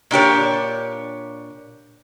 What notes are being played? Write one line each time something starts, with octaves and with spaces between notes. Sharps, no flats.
A#2 D4 G4 C#5